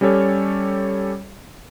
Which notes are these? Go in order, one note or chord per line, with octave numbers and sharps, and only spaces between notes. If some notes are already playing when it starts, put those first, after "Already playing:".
G3 C#4 G4 A4 C#5